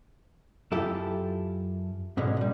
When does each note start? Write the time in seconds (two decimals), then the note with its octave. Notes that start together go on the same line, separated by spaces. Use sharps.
0.72 F#2 E4 F4 G4 A4
2.17 G#2 B2 D3 C#4
2.37 A#2 G3